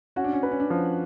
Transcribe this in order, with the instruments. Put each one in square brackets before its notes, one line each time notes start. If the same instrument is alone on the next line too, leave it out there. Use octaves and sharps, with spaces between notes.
[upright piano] C#4 [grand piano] F#4
[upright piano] D4
C#4
[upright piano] D4 [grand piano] B4
[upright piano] C#4
D4
[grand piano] F3 [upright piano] C#4